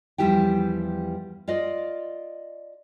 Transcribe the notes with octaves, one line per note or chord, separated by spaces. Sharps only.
E2 F3 G3 E4 G4 G5
F4 D5 D#5